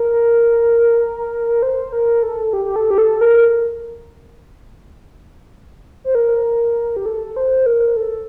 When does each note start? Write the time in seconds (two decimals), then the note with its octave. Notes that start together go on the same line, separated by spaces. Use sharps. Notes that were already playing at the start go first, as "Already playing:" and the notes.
Already playing: A#4
1.63 C5
1.93 A#4
2.23 A4
2.53 G4
2.65 G4
2.76 A4
2.90 G4
2.98 A4
3.21 A#4
6.04 C5
6.15 A#4
6.97 G4
7.06 A4
7.36 C5
7.66 A#4
7.96 A4